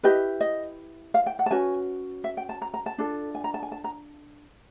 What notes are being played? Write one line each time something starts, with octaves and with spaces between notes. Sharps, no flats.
E4 G4 B4 D#5
D#5
F5
G5
F#5
A5
C#4 F#4 B4 G#5
E5
G5
A5
A#5
A#5
A5
D4 F4 A4
G#5
A#5
A5
G#5
A5
A#5